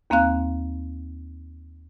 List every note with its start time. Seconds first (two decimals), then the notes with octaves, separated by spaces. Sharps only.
0.10 D#2 A#3 C4 F5 F#6